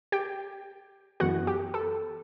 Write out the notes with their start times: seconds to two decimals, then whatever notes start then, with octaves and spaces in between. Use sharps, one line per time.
0.12 G4 G5
1.20 F#2 E3 B3 F#4 F#5
1.47 G4
1.74 A4